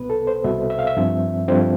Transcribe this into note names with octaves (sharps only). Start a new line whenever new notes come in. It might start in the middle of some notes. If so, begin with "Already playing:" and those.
Already playing: C2 B2 B3 B4
A4
C5
C2 B2 B3 E5
E5
F5
E5
G2 F3 C4
G2 F3 C4